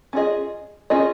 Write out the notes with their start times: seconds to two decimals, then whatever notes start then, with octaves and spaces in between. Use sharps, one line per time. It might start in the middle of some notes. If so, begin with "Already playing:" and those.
0.13 C#4 F4 G#4 D#5
0.90 C#4 F4 G#4 D#5